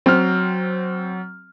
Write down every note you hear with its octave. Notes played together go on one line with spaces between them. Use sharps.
F#3 C4 F6